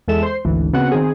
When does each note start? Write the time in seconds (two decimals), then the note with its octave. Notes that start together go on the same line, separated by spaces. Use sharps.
0.08 E2 G#3 A4 E5 E7
0.23 C5 C6
0.45 G#1 D2 E3
0.73 C#3 B3 C4 F#4 F#5
0.92 D#3 C4 G#4